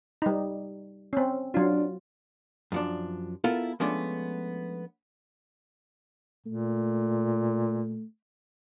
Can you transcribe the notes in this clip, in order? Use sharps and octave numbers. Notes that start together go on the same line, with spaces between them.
G3 D#4
C4 C#4
F#3 D4 F4
F#2 F3 D4
B3 E4 F4 A4 A#4
F3 G#3 A3 B3 C#4 D4
A#2 A3